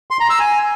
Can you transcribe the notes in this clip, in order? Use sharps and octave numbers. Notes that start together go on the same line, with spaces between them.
C6
A#5
E6
G#5